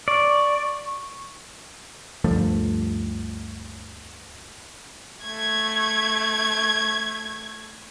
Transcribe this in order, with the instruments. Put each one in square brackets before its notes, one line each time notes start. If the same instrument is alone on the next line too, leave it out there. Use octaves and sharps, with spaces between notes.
[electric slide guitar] D5 [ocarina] C#6
[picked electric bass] D2 G2 F3 A3
[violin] A3 G#6